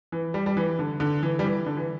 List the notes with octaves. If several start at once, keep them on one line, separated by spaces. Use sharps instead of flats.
E3
G3
G3
E3
D3
D3
E3
G3
E3
D3
E3